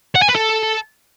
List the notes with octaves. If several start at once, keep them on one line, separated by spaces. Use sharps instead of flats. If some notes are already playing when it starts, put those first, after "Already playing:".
F#5
G#5
B4
A4